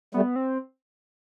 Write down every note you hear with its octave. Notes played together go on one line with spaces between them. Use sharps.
G3 A3 B3
C4